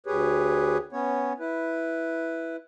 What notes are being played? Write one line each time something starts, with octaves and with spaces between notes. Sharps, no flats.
D2 G4 G#4 B4 C#5
B3 C#4 C#5
E4 B4